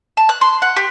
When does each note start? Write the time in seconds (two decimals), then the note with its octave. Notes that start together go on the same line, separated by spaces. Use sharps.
0.17 A5
0.29 F#6
0.41 C6
0.62 F#5
0.76 G4